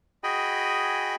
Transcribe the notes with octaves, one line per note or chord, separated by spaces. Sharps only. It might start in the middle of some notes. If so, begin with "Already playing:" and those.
F#4 G#4 D#5 G5 G#5 B5